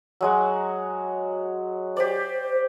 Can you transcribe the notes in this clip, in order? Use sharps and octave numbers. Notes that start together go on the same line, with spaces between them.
F#3 G#3 F#4
G4 C5 D5